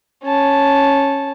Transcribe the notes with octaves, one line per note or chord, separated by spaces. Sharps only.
C#4 A5